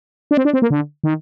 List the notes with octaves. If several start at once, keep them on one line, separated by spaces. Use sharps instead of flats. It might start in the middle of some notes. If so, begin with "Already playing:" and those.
D4
C4
D4
C4
A#3
D3
D#3